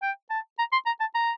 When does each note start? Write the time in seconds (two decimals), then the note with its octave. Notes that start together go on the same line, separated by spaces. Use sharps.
0.02 G5
0.30 A5
0.59 A#5
0.72 C6
0.86 A#5
1.00 A5
1.14 A#5